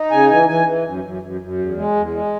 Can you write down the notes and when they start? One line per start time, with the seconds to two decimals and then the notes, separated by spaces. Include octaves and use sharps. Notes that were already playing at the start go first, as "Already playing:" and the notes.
Already playing: D#4
0.11 C#3 G#5
0.29 E3 G#5
0.48 E3 G#5
0.66 E3
0.85 F#2
1.04 F#2
1.22 F#2
1.41 F#2
1.58 E2
1.77 G#3
1.95 E2
2.14 G#3